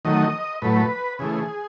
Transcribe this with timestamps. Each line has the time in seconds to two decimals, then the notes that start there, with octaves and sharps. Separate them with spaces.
0.05 D#3 F#3 A3 D#5
0.62 A2 F#3 A3 B4
1.19 C#3 E3 A3 G#4